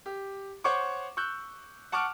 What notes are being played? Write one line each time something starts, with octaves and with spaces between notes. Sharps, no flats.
G4
C5 C#5 F#5 C#6 D6
C#6 E6 F#6 G6
F#5 A5 C#6 D6 F6 D7